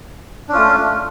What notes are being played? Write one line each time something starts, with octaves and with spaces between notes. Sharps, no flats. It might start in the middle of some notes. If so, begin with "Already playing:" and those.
A3 C#4 D4 F4